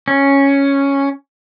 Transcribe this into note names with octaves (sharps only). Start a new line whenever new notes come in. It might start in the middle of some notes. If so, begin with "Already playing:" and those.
C#4